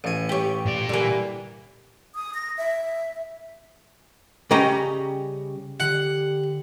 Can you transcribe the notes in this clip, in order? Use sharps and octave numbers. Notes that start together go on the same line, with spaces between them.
A1 G#5
G4 C#5
A#2 D5
D3 E3 G3 A#4
D#6
A#6
E5
C#3 G3 C#4 D#5 G5 A#5
D3 G4 F#5